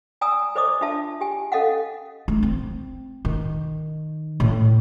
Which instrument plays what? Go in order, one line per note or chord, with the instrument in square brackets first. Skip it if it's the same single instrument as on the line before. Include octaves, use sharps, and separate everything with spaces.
[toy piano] D5 G#5 A#5 D#6 E6
B4 C5 D5 D#5 D6 D#6
D4 F4 E5 A5
G4 G#5
C#4 A4 D#5 F5 F#5
[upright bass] A3
C4
D#3
A2